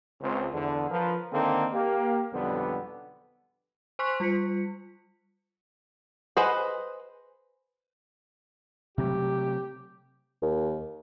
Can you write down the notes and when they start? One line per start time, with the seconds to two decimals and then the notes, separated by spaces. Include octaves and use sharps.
0.22 C#2 C4 C5
0.52 E2 D3
0.90 F3 A#4 B4
1.32 D3 D#3 A#3 C4 D#4 A4
1.73 A#3 G4
2.33 B1 F2 D3 G3 B3
3.99 C5 G#5 C6 C#6 F#6 B6
4.20 G3 F4 B6 C#7
6.37 G#4 B4 C5 D#5 F#5
8.98 C3 F#3 A3 G4
10.42 D#2